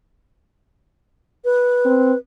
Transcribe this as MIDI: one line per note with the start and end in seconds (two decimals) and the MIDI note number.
1.45 2.17 71
1.85 2.13 60